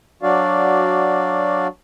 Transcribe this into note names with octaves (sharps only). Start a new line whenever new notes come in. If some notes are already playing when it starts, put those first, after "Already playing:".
F#3 D4 F#4 D5 F5